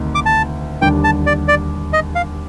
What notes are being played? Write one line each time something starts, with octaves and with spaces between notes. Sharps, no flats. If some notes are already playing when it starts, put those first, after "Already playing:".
Already playing: D2 C3 D#3
D6
A5
D#2 D3 G3 D4 G5
A5
D5
D5
D#5
F5